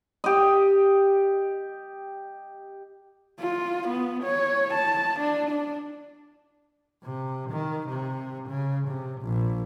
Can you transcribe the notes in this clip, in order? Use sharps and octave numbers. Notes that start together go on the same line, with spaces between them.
G4 D#5
F4
B3
C#5
A5
D4
D4
C3
D#3
C3
C#3
C3
A#1